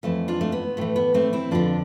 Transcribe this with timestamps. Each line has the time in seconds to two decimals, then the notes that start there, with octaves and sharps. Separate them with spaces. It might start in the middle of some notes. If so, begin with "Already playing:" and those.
0.03 F2 E3 A3
0.28 D4 F4
0.41 A3
0.52 B3
0.77 A2 E3 A3
0.96 B3
1.14 A3 C4
1.33 C4 E4
1.51 F2 D3 D4 F4